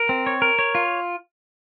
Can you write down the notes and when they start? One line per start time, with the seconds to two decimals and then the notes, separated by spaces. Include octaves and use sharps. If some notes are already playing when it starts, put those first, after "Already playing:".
Already playing: A#4
0.09 C4
0.27 C#5
0.42 A#4
0.59 C#5
0.75 F4